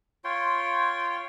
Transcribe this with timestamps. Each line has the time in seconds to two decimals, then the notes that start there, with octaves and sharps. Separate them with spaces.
0.24 F4 C#5 G5 C6